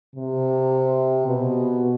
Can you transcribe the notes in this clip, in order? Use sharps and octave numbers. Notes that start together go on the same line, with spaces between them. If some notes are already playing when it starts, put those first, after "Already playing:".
C3
B2